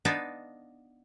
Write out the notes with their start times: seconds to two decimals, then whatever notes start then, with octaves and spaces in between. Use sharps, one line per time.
0.05 B3 D4 D#4 F4 D5 G#5